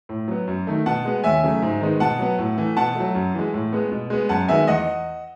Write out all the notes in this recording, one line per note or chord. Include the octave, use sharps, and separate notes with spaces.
A2
F#3 B3
F#2
D#3 A3
B2 F#5 A5
G#3 B3
D#2 E5 G#5
C#3 F#3 A3
G#2
D#3 G#3 B3
B2 F#5 A5
F#3 B3
A2
E3 A3
B2 F#5 A5
F#3 A3
F#2
E3 G#3
A2
G#3 B3
B2
G#3 B3
F#2 F#5 A5
D#3 G#3 B3 E5 G#5
E2 D#5 F#5